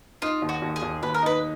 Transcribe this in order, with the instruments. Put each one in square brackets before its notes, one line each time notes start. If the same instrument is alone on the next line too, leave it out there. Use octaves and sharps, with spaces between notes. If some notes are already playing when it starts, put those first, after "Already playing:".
[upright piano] D#4 [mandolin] F4
[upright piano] D#2
[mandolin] F#4
[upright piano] D#2
[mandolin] G#4
[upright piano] D#2
[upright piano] D#2 [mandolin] B4
[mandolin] A#4
[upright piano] D#4 [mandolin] B4